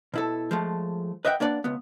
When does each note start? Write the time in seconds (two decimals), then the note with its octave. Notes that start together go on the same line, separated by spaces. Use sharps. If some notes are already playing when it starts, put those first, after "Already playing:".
0.14 B2 E4 A4
0.51 F3 G#3 A3
1.25 B4 D#5 E5 F#5 G5
1.40 A#3 D4 B4 D5 F#5
1.64 C#2 B3